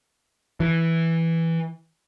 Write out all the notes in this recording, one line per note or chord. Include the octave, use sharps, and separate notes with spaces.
E3